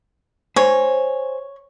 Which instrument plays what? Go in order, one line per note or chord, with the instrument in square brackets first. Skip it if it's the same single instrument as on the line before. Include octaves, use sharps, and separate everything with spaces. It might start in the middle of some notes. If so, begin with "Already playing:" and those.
[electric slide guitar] C5 G#5 [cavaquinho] C#5